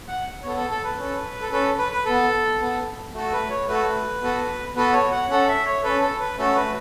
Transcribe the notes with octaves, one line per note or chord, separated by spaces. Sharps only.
F#5
B3 A4 C#5
A4
A4
B4
C#4 A4
A4
C#4 A4 B4
B4
B4
B3 A4
B3 A4
A3 F#4 A4
B4
C#5
A3 F#4 A4 B4
B3 F#4 A4
B3 F#4 A4 B4
C#5
F#5
C#4 A4 F#5
E5
C#5
C#4 A4 B4
A4
B4
A3 C#4 F#4 A4
B4